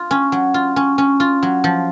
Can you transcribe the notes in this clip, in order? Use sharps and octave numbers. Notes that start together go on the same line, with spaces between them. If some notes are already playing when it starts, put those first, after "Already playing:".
Already playing: F4
C#4
F#3
F4
C#4
C#4
F4
F#3
F3